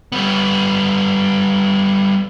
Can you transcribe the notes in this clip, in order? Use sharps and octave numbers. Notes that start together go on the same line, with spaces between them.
G3 B3